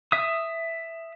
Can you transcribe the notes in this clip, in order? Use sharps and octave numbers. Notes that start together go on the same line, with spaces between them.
E5 D#6